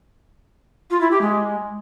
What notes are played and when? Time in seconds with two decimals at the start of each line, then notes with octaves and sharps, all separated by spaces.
0.90 F4
1.00 E4
1.11 G4
1.21 G#3